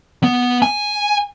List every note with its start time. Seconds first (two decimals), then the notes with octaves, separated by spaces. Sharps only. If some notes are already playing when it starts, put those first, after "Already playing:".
0.23 B3
0.62 G#5